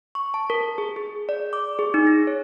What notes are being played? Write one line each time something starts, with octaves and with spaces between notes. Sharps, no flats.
C#6
A5
A#4
G#4
G#4
D5
D6
G#4
D#4
A#6
C#5